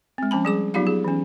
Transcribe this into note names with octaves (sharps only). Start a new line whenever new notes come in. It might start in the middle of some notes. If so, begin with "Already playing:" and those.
G#3 C4
F3 C#4 A5 B5
G3 G#4 D6
F#3 B3 D#4 F4 G4 F5
G#4
E3 C#4